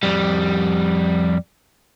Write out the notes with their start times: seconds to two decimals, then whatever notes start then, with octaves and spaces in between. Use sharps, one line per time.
0.03 F2 G3